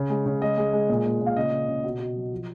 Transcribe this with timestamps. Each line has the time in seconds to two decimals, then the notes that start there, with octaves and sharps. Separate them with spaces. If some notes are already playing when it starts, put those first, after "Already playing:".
Already playing: C#3
0.10 G#3
0.26 C#3
0.42 G#3 D#5
0.58 G#3
0.73 G#3
0.89 A#2
1.05 A#2
1.21 A#2
1.26 F5
1.36 C#3 D#5
1.52 C#3
1.68 C#3
1.84 B2
1.99 B2
2.16 F#3
2.32 F3